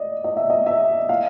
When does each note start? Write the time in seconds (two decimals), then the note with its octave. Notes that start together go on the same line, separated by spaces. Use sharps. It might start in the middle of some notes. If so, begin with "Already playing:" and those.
Already playing: D5 D#5
0.24 D#5
0.37 E5
0.50 D#5
0.66 E5
1.09 F5